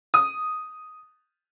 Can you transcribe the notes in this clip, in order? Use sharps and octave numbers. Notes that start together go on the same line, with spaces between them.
D#6